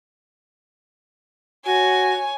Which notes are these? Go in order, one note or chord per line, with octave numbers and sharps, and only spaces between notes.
F#4 C#5 G#5